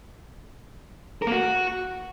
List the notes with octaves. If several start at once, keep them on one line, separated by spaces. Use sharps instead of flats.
A#4
A#3
F#4